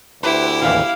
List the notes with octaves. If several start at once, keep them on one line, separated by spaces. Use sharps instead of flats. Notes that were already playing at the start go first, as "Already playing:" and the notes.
D2 E4 G4 B4 C5
A1 D#2 E3 F5